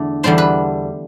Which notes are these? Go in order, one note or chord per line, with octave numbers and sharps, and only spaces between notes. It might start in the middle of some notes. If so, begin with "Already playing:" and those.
Already playing: E2 D3 A3
E2 D3 G3 B3 D4 C5
B4